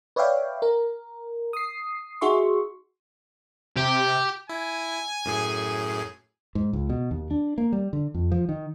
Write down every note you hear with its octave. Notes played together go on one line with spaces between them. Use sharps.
B4 C#5 D5 E5 F5 G5
A#4
D#6 C7
D#4 F#4 G#4 E5 C6 C#6
C3 G4
E4 G#5
F#2 A2 G#4
G#2
C#2
B2
D#2
D4
A#3
G3
D3
F2
F3
D#3